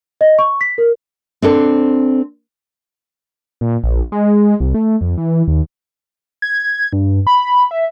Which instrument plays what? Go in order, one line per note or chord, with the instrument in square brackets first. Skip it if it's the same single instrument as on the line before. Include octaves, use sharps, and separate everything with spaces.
[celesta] D#5
C#6
B6
A#4
[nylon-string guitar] C4 D4 A4 C5
[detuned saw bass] A#2
A#1
G#3
C2
A3
F2
E3
D#2
[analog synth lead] G#6
G2
B5
E5